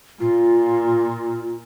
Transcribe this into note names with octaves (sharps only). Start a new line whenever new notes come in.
A#2 F4